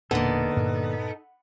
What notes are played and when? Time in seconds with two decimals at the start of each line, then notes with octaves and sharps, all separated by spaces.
0.11 E1 A#2 D3 A#3 B3 D#4 A4
0.57 G2 A#2 D4